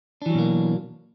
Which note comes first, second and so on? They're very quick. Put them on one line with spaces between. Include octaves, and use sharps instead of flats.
D4 E3 F#3 B2 A#3